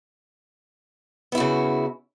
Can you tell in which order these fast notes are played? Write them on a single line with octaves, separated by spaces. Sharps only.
B3 E4 F#4 C#3